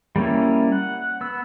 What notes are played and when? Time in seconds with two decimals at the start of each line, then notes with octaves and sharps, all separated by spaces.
0.16 G3 A#3 C#4 E4
0.72 F#5
1.21 B3 E6